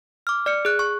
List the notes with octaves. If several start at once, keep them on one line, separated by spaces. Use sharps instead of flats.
D6 F6
D5 F6 C#7
G#4 F#6
C#6